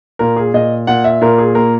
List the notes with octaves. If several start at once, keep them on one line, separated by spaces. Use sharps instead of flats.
A#2 A#4
G#4
A#2 D#5
A#2 F#5
E5
A#2 A#4
G#4
A#3 A#4